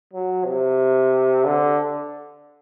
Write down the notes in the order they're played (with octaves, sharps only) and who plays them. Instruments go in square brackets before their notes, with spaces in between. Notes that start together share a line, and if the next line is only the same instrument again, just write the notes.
[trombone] F#3
C3
D3